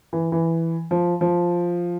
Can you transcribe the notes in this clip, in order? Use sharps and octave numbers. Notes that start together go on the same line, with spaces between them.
E3
E3
F3
F3